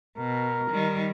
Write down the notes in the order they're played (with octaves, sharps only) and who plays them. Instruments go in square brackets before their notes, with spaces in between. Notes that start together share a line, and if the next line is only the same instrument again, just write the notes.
[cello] B2 [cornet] A#4
[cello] D#3 G3